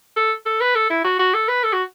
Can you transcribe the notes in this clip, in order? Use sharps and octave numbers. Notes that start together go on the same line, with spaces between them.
A4
A4
B4
A4
E4
F#4
F#4
A4
B4
A4
F#4